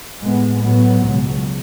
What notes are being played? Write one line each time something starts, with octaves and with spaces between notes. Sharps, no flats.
A2 G#3 B3
A2 F#3 B3
C#2 B2 F#3